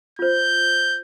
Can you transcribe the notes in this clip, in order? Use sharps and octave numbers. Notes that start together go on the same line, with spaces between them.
F4 C5 G6